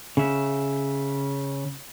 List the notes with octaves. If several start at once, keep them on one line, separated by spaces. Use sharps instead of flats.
C#3 E5